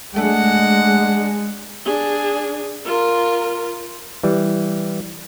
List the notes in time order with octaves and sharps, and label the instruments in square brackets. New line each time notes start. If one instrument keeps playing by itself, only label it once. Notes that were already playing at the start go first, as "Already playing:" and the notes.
[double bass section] G#3 [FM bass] A3 [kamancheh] D4 [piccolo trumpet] F#5
[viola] D4 G#4
F4 A#4
[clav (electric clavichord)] E3 G3